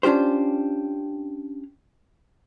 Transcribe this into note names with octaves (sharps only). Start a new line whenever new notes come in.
C#4 D4 F4 G4 C5